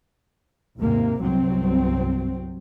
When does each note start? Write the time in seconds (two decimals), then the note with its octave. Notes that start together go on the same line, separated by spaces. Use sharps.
0.77 D#2 G#2 C3 A#3
1.20 C2 G2 F#3 C4